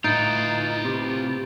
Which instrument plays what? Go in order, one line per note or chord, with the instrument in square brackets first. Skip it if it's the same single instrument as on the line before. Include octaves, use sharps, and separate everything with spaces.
[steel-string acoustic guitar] A2 [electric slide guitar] D#4 [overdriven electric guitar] F4 B4 [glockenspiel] G6 A6 D7
[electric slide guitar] C3